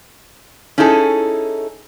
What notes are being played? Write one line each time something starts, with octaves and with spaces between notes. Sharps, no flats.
C#4 D#4 E4 G#4 A4